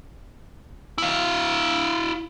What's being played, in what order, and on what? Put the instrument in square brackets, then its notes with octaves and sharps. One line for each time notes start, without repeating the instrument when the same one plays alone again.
[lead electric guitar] E4 F5